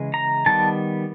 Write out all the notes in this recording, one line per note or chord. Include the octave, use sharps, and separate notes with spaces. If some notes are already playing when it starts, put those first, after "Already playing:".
Already playing: C#3 E3 G#3
A#5
D#3 G3 B3 A5